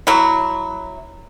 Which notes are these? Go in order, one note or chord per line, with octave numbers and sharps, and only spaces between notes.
F#3 E4